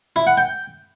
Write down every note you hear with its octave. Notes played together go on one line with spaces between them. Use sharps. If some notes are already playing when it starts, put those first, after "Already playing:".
E4
F#5
G5